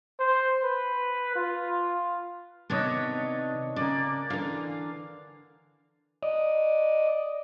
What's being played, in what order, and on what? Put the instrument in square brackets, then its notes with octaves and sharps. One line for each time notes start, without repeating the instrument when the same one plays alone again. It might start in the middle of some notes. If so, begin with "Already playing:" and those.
[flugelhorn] C5
B4
F4
[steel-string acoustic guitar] C3 D#3 B3 [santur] D4 C#5 D#5
[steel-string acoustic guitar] C#3 [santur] A#3 D5
[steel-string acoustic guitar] D3 E3 [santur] F5
[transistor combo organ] D5 D#5